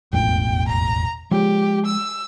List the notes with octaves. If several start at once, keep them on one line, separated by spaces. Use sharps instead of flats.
E1 A1 F2 G5
A#5
F3 G#3 G4
E6